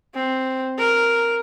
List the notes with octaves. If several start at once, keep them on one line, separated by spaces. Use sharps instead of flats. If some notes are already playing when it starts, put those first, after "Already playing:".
C4
A#4